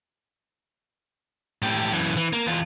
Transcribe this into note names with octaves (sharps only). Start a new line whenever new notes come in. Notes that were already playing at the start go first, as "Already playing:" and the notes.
A2 G4
F#2 E3
E3
A#3
E2 F4